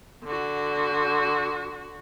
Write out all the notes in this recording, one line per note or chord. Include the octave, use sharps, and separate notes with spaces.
D3 F#4